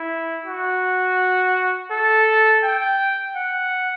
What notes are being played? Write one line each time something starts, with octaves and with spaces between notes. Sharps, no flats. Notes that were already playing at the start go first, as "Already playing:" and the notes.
Already playing: E4
F#4
A4
G5
F#5